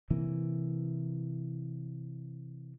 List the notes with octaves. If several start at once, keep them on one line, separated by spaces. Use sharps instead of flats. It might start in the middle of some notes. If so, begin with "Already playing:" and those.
C3 E3 A#3